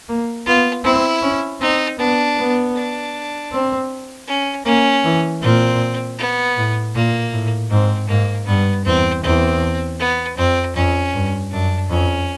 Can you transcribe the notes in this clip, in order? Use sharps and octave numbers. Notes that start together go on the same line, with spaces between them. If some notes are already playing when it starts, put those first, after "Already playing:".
A#3
B3 F4
C4 E4
C#4
C4 D#4
B3 D4
B3
D4
C4
C#4
A#3 C#4
E3
A#2 C4
B3
A2
A#2 A#3
A2
G#2 C4
G#2 A#3
G2 B3
E2 C4
E2 C4
B3
F2 C4
F2 C#4
G2
F#2 D4
F2 C#4